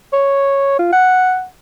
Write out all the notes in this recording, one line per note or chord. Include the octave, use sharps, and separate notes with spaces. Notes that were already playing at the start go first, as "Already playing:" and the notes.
C#5
F4
F#5